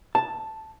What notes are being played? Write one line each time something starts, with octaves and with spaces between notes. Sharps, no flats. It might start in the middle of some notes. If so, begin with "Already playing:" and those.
A5